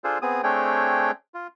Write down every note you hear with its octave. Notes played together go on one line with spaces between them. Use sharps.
D4 F4 G#4 A4 C5
B3 C4 G#4 D#6
A3 C4 D4 G#4 C#5 G5
F4